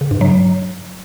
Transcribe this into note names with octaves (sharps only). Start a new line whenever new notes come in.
C#3
G2
F#3